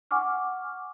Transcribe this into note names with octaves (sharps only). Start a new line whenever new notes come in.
F#5 G#5 C#6 D6 F6